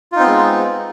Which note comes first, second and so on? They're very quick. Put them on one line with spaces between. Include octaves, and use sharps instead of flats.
F4 D#4 C4 B3 G#3